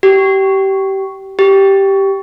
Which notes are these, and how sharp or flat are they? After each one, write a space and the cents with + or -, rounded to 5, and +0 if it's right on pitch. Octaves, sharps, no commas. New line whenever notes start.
G4 -20
G4 -5